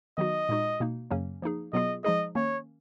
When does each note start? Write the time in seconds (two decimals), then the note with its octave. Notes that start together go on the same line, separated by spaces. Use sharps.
0.17 D#3 F#3 B3 D#4 F#4 D#5
0.49 A#2 G#3 D#4 F#4
0.80 B2 A#3 D#4
1.11 F#2 C#3 F#3 A#3 C#4
1.42 F3 A#3 D#4 G#4
1.73 B2 F#3 B3 F4 G#4 D#5
2.04 F3 G#3 D#4 G#4 D#5
2.35 D#3 A#3 C#4 C#5